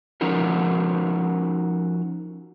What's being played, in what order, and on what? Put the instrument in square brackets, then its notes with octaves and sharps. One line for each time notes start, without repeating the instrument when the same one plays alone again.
[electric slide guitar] F3 C#4 D#4 F#4 A#4 C5